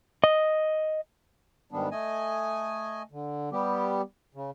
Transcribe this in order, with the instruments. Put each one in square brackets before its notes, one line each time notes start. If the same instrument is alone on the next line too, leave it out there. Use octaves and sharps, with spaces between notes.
[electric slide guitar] D#5
[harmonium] G#2 D#3 G3 B3 D4
A3 D#5 G#5
D3
G3 B3 G4
C#3